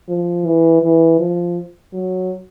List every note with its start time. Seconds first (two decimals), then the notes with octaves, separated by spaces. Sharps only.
0.09 F3
0.45 E3
0.82 E3
1.19 F3
1.93 F#3